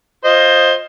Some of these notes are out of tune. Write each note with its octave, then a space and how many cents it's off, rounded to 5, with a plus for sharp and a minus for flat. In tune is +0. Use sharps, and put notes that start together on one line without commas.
F4 +0 C5 +15 D#5 -5